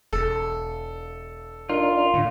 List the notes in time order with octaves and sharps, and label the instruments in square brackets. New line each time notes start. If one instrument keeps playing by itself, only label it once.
[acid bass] E1 [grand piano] A4
[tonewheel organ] D4 D#4 A#4 [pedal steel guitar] F4
[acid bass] A2 [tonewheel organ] D3